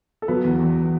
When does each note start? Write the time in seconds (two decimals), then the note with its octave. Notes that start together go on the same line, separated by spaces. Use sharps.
0.22 A4
0.28 F#3 B3 B4
0.44 E2
0.60 E2